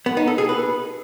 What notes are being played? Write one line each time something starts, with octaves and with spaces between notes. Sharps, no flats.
B3
D#4
A4
G#4
B4